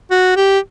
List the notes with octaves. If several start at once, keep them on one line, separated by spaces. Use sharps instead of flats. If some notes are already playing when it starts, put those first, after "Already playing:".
F#4
G4